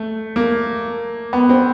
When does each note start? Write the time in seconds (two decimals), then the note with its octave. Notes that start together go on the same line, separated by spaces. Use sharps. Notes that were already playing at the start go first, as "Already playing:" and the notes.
Already playing: A3
0.36 A#3
1.33 B3
1.49 C4